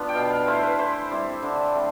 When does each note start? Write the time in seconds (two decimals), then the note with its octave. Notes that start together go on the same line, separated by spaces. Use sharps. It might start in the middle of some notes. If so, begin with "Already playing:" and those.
Already playing: B3 D4 F4 B4
0.09 G5
0.15 B2 F5
0.31 F5
0.47 A3 E4 C5
0.63 B4
0.78 E3 C5
1.11 G3 C4 E4
1.42 D3
1.75 A3 C4